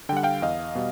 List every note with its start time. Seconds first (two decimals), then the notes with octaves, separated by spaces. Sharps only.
0.09 D3 G5
0.12 G3 F#5
0.23 F5 G5
0.42 E2 D#5 F5
0.75 B2 G3